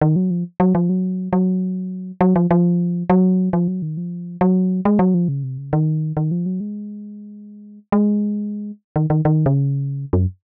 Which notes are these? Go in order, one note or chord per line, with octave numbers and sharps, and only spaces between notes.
D#3
F#3
F3
F#3
F3
F#3
F#3
F#3
F3
F3
F#3
F3
F#3
D#3
F3
F#3
G#3
F#3
F3
C#3
C3
C#3
D#3
D#3
F3
F#3
G#3
G#3
D#3
D#3
D#3
C#3
F#2